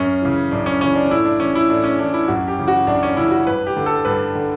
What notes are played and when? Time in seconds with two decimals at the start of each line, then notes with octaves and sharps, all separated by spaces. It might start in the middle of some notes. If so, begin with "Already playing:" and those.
Already playing: F#2 C#4
0.22 C#3 E3
0.51 F#2 D4
0.66 C#4
0.81 C#3 E3 C#4
0.95 D4
1.06 D4
1.11 A2 E4
1.25 D4
1.40 E3 C#4
1.55 E4
1.69 A2 D4
1.84 C#4
1.99 E3 D4
2.14 E4
2.28 F#2 F#4
2.48 G4
2.59 C#3 E3
2.68 F#4
2.87 F#2 D4
3.03 C#4
3.17 C#3 E3 E4
3.31 F#4
3.47 G2 B4
3.67 G4
3.76 D3
3.86 A4
4.05 G2 B4
4.35 D3